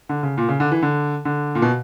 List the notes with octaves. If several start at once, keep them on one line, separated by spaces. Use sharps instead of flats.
D3
C#3
A#2
C#3
D3
E3
D3
D3
A#2
B2